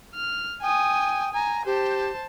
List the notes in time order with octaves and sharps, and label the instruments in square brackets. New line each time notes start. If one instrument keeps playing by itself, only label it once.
[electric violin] F6
[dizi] G5 [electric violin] G#5 D#6
[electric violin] G#5 [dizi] A#5
[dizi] G4 [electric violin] C5 A5